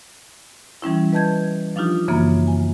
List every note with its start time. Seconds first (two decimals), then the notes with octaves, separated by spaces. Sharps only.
0.82 E3 G3 C#4 E4
1.13 B4 D#5 A5 G6 G#6
1.76 F3 D4 D#4 F4 G4
2.08 F#2 C#3 E3 A#3 B3
2.47 G#5